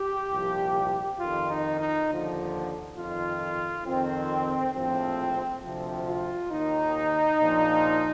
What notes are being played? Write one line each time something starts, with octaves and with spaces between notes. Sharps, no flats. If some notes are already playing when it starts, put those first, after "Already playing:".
Already playing: G4
C2 A#2 F3
F2 D#3 F4
D#4
D#4
D#2 D3 F3
F2 D#3 F4
F2 D#3 C4
A#1 A2 F3 C4
D2 C3 F3
F4
D#2 D#3 D#4
A#1 A#2 F3